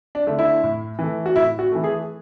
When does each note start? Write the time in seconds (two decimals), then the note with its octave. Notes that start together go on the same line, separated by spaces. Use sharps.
0.15 D4
0.27 D3 A3
0.39 E4
0.64 A2
0.99 E3 A3
1.26 F#4
1.36 A2 E4
1.59 F#4
1.72 E3 A3
1.84 G#4